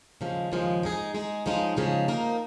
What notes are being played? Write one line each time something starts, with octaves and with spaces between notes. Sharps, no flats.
D#2 C#3 F3 G#3
D#2 C#3 F3 G#3
G#3 D#4 G#4
G#3 D#4 G#4
C#3 F3 G#3 D#4
C#3 F3 G#3 D#4
F3 A#3 D#4 A#4